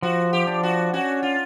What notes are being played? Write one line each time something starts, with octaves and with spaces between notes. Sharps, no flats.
F3 F#4
G4
D4
F#4
C#4 F#4
F4